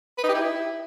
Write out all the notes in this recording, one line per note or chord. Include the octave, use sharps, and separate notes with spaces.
B4
D#4
G4
E4